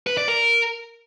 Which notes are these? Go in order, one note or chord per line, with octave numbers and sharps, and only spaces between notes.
B4
D5
A#4